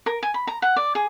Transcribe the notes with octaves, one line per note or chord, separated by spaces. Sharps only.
A#4
G#5
B5
A#5
F#5
D5
G#4